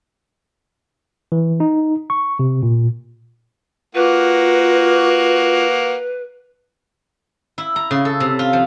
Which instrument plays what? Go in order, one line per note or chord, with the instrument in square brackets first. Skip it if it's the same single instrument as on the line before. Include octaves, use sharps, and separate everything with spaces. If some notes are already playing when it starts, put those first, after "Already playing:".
[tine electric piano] E3
D#4
C#6
C3
A#2
[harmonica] A#3 F#4 [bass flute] F4 [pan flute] B4
[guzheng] E4
A#5
C#3
A4
C3
F4
F3